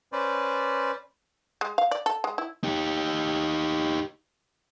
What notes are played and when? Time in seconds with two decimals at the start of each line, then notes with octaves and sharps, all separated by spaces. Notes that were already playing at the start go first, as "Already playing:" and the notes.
0.13 C#4 B4 C5 D5
1.61 G#3
1.78 F5
1.91 D5
2.06 A4
2.24 G#3
2.38 E4
2.64 D#4 G4